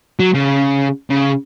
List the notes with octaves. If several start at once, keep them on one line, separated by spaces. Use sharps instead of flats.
F#3
C#3
C#3